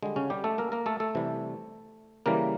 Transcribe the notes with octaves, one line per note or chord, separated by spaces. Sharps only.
D3 G3 G#3
C#3 C#4
G3 G4
A3 A4
A#3 A#4
A#3 A#4
A3 A4
A3 A4
C3 E3 G3
C#3 E3 G3 A#3 A#4